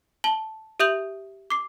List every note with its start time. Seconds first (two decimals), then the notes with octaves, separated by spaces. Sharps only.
0.24 A5 F#7 G7
0.80 G4 E5 D#6 G6 F7 F#7
1.50 D6 C7